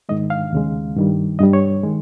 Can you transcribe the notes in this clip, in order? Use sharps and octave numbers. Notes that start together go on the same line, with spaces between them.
G#2 D#3 G#3 D#5
F5
D#2 C#3 G#3
G2 D#3 G3
G2 G3 D#5
C#5
D#3 G#3